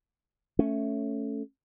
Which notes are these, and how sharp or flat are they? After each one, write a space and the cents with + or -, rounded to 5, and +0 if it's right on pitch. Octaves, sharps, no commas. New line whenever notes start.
A3 +0 C#4 +0